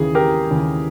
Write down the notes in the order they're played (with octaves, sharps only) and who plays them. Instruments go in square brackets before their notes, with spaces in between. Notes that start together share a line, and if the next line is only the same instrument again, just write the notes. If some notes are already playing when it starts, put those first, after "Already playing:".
Already playing: [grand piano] D#2 C#3 E3 G#4
G4 A#4
D#2 C#3 E3